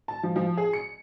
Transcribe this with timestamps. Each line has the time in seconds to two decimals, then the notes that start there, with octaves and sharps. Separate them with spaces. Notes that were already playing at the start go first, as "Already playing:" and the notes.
0.08 A5
0.23 F3
0.36 F3
0.57 G#4
0.73 C#7